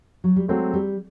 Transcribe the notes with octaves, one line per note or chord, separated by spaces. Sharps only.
F#3
G3
F#3 G#3 A3 C4
G3